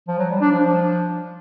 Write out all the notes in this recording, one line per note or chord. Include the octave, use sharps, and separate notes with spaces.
F3
F#3
G3
D4
F3